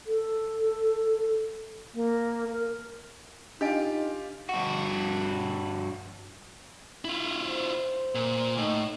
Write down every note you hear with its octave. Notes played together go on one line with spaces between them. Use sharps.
A4
A#3
A#4
D4 D#4 F4 G4 D#5 G#5
G2 F#4
E4 F4
C5
A#2
A2 D#4